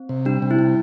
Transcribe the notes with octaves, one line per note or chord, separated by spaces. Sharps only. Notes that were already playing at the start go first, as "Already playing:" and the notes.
Already playing: C4
C3
G3 D4
C3
E4
G3